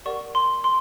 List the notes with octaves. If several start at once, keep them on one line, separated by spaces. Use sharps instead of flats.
G4 A#4 D5 F#5 C#6
C6
C6